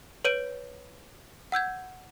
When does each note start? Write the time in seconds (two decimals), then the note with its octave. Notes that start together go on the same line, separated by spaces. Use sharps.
0.25 B4 C#5 G6 D7 D#7
1.52 F#5 E6 G6 G#6